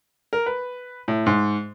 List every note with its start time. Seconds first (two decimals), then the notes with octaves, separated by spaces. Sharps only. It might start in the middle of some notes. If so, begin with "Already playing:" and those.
0.33 A#4
0.46 B4
1.08 A2
1.26 G#2